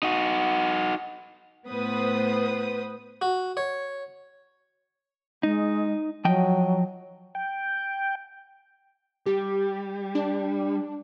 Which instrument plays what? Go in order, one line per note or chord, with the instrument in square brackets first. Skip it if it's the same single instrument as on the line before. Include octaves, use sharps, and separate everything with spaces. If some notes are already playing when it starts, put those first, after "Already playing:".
[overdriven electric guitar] D#4 F#4
[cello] A2 B3 [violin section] B4 C5 D#6
[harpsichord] F#4
C#5
[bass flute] G#3 [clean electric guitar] D#4
[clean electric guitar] F3 D#5 G5 [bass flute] F#3
[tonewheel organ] G5
[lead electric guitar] G3 [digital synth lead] G4
[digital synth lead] D4